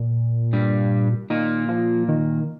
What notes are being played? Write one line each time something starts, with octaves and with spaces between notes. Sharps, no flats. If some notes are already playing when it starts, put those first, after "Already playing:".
Already playing: A#2
G2 G3
A#2 D#3 A#3
F3
D#3